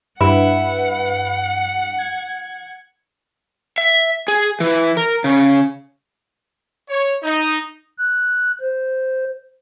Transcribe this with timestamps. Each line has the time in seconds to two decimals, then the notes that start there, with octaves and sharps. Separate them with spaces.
0.21 G2 E4 B4 F#5
1.98 G#6
3.78 E5
4.28 G#4
4.60 E3
4.97 A#4
5.24 C#3
6.89 C#5
7.23 D#4
7.98 F#6
8.61 C5